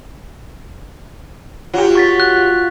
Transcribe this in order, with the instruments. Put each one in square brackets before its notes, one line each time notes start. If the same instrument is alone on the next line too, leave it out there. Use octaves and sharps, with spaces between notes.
[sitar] F#3 G4 [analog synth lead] F4
[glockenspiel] C#6 A6 B6
F#6